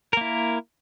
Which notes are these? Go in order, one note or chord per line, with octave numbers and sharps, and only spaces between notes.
A#3 E4 A#4